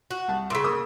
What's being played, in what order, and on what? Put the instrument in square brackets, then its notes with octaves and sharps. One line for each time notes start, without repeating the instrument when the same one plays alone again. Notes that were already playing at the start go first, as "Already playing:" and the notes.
[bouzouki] F#4
[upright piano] C2 A5
[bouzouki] A#2 C#3 [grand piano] C6 E6 B6
[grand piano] A#3 [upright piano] D#6 E6